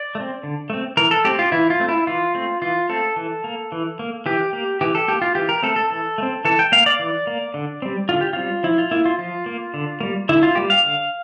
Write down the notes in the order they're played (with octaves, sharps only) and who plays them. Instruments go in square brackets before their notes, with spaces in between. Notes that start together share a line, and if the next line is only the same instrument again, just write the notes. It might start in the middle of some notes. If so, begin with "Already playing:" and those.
Already playing: [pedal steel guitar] D5
A3
C4
D3
A3 C4
E3 A#4
A4
A3 C4 G4
F4
E3 E4
F4
A3 C4
E4
E3 F4
A3 C4
E3 F4
A3 C4 A4
E3
A#3
E3
A#3
E3 G4
A#3
E3 G4
A4
A#3 G4
F4
E3 G4
A#4
A3 C4 A4
A4
E3 A4
A3
C4
E3 A4
G5
A#3 F5
D5
E3
A#3
D3
G3 C4
D3 F4
G4
G3 C4 F4
F3 E4
F4
A#3 E4
F4
F3 F4
A#3
D3
G3 A#3
D3 E4
F4
G3 A#3 G4
F5
D3